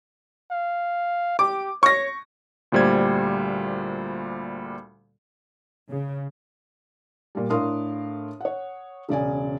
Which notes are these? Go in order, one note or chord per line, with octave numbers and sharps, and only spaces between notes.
F5
G4 D6
C#5 C#6 A#6
D2 A#2 G3 C5 G#6
C#3
A#2 G3
A2 D4 A#4 F5 C6 D#6
C#5 F#5
E1 C#3 D5 G#5